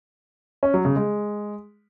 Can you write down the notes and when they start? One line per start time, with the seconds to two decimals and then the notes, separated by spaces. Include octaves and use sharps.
0.63 C#4
0.74 F#3
0.85 C#3
0.96 G#3